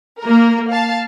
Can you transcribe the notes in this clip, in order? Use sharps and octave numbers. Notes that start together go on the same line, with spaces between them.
A#3 A#4
F5 A5